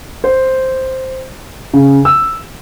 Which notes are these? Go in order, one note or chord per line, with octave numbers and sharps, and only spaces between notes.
C5
C#3
E6